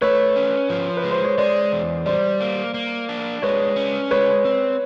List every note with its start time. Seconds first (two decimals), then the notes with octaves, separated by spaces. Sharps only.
0.01 A3 B4 C#5
0.36 C#4
0.70 F3
0.97 B4
1.04 G#3
1.11 C5
1.24 C#5
1.38 G#3 C5 D5
1.72 E2
2.06 G3 C5 D5
2.40 A#3
2.74 A#3
3.09 D4
3.42 G#3 B4 C#5
3.76 C#4
4.11 G#3 B4 C#5
4.45 C4